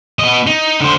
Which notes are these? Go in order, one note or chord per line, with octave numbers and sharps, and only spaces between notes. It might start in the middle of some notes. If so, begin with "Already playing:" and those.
B3 D#5
D#4
D3 C5